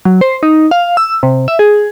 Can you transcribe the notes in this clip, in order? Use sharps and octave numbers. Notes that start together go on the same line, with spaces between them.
F#3
C5
D#4
F5
E6
C3
E5
G#4